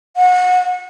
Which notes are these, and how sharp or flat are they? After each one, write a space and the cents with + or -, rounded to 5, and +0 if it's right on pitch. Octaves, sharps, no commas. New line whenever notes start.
F#5 -30